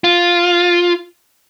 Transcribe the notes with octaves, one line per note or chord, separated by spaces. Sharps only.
F4